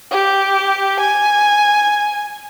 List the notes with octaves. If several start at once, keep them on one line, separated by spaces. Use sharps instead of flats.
G4
G#5